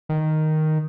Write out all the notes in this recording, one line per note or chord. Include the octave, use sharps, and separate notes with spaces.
D#3